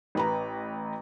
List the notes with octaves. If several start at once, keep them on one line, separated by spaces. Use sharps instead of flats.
A1 B4 A#5